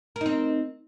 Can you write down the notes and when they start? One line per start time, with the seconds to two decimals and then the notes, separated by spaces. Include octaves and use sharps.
0.16 A#4
0.21 D#4
0.26 C4